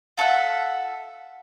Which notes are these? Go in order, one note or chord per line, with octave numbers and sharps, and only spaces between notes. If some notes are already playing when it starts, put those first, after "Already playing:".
F4 A4 E5 F#5